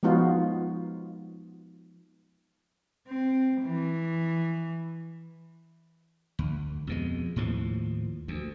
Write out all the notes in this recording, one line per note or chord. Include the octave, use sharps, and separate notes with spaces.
F3 G#3 B3 D#4 F4 F#4
C4
E3
D2
F2 B2 G#3
D#2 A2 F3
D2